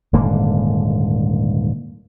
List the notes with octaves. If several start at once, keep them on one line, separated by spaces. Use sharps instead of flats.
D#1 G#2 D3 A#3